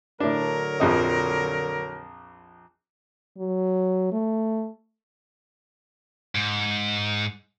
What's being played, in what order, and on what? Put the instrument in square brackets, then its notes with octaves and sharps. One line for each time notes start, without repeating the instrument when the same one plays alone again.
[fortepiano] A2 D4 [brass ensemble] D3 F#3 A#4
[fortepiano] A#1 F2 D#5
[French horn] F#3
A3
[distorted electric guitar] G#2